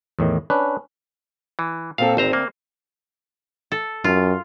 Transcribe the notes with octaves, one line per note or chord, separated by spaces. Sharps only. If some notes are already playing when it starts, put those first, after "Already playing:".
E2 A2 D#3
C#4 D4 B4
E3
A#2 C4 A4 F5
G#1 D2 C4 C5 A#5
A#3
A4
F#2 F4